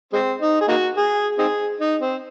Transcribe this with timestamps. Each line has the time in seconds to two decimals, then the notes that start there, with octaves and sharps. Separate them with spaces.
0.13 G#3 C4
0.41 D#4
0.61 G#4
0.68 A#3 D#4 F#4
0.97 G#4
1.38 C4 D#4 G#4
1.81 D#4
2.01 C4